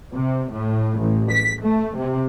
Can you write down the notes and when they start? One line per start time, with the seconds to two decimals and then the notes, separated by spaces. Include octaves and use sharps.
0.14 C3
0.51 A2
0.99 A1
1.31 B6
1.63 A3
1.97 C3